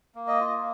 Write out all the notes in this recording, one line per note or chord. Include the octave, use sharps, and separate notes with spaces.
A#3
D#5
F4